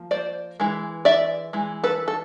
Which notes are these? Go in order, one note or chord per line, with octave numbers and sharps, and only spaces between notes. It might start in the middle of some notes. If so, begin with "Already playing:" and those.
Already playing: F3 A#3
C5 D5
E3 G#3
D5 E5
E3 G#3
A4 B4
A4